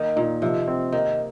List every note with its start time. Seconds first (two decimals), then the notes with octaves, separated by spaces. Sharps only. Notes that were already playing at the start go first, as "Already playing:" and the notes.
Already playing: D#3 A#3
0.16 A#2 D#4
0.42 C3 F3
0.68 C4
0.92 D#3 A#3